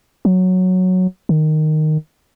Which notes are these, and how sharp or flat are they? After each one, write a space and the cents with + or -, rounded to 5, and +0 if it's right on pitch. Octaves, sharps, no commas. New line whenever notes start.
F#3 -5
D#3 -10